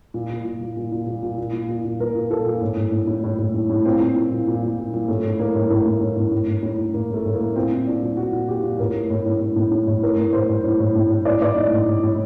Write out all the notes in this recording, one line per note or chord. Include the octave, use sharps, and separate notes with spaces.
A#2
A#2
A#2
A#2
A#2
A#2
A#2
A#2
A#2
A#2
A#2
A#2
A#2 A#4
A#2
A#2 A4
A#2
A2
A2
A2
A2
A2
A2
A2
A2
A#2 C4
A#2
A#2
A#2
A#2
A#2
A#2
A#2
A2 A3
A2
A2 A#3
A2
A2 A#3
A2
A2
A2
A2
A2
A2
A2
A2 A#3
A2 A3
A2
A#3
A2
A#2 C4
A#2
A#2 D4
A#2
A#2 F#4
A#2
A#2 G4
A#2
A2 A#4
A2
A2
A2
A2
A2
A2
A2
A2 A#4
A2
A2 C5
A2
A2
A2
A2
A2
A2 D5
A2 D5
A2 D#4
A2
A2
A2